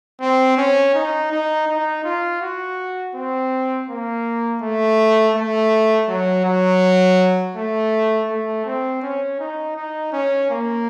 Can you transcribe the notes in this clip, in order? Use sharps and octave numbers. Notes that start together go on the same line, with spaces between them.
C4
C#4
D#4
D#4
D#4
F4
F#4
C4
A#3
A3
A3
F#3
F#3
A3
A3
C4
C#4
D#4
D#4
C#4
A#3